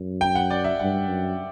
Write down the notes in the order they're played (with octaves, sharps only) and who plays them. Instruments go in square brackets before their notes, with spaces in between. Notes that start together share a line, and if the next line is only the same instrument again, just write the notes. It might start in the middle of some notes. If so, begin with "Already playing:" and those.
Already playing: [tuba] F#2
[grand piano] G5
F#5
D5
E5
[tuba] G2 [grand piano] F#5
[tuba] F#2